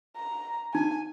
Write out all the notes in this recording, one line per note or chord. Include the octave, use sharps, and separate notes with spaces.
A#5
D#4 G#5